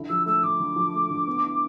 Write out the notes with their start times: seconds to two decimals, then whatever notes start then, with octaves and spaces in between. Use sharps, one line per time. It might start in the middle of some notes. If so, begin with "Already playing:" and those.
Already playing: D3 E4
0.09 F3 E6
0.26 A3 E6
0.43 D3 D6
0.60 D3
0.76 F3
0.94 A3
1.11 D3
1.28 B3
1.44 E4